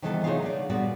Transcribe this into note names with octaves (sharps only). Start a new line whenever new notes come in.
C3 D#3 E3 G3 B3 A4
F#3 A3 D#4 F4 G#4 F5
D3 D5
A#2 G3 B3 F#4 D5